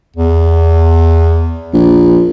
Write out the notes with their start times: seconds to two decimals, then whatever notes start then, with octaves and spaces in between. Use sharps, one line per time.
0.16 E2
1.74 A#1